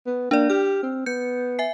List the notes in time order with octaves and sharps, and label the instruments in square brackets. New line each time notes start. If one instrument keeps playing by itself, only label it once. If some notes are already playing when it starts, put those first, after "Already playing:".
[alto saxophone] B3
[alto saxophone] A#3 [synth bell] D4 D5
[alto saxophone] G4 [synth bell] F6
[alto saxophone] C4
[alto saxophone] B3 [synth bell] G6 C#7
[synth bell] E5 G#5 C7